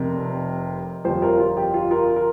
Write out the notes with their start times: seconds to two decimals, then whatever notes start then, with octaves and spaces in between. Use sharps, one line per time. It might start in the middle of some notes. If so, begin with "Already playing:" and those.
Already playing: F1 F2 C3 A#4
1.04 G1 F2 F3 G4 C5
1.22 F4 A#4
1.40 F4
1.57 G4
1.74 F4
1.91 F4 A#4
2.16 A#4